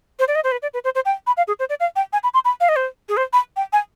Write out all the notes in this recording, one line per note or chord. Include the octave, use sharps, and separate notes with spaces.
C5
D5
D#5
C5
B4
D5
B4
C5
C5
G5
B5
F5
G#4
C5
D5
F5
G5
G#5
B5
C6
B5
F5
D#5
C5
G#4
C5
B5
G5
G#5